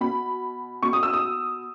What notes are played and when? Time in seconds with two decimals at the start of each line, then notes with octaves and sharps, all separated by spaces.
0.01 B2 B5
0.82 B2 C#6
0.93 D#6
1.03 E6
1.13 D#6